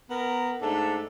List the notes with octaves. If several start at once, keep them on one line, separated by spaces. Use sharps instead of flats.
B3 A#4
G#2 A3 D4 A4